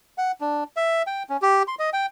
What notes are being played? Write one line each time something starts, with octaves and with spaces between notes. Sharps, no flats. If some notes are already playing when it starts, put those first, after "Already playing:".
F#5
D4
E5
G5
C#4
G4
C6
D#5
G5